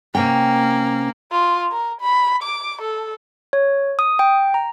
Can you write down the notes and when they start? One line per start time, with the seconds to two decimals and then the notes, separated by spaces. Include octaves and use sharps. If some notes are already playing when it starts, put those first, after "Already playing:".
0.15 C3 A#3 C#4 G5
1.32 F4
1.71 A#4
2.01 B5
2.43 D6
2.82 A4
3.53 C#5
3.99 D#6
4.19 G5
4.54 A#5